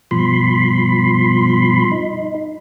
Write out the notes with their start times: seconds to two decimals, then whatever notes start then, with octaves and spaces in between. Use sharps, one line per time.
0.11 G2 B2 F3 B5 C6
1.91 D#4